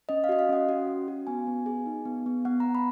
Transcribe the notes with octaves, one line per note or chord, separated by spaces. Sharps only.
C#4 D#5
F5
F#4 D#5
F5
C#4 F#5
F#4
C#4
F#4
B3 G#5
B3
G#4
D#4
B3
B3
B3 F#5
B3 A#5
B5